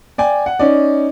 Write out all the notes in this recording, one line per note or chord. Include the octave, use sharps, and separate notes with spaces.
D5 G5 G#5
F#5
C#4 D#4 D5